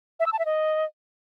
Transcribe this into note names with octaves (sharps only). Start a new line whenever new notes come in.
E5
E6
A5
E5
D#5